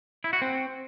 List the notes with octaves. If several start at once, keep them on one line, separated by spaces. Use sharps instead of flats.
E4
F#4
C4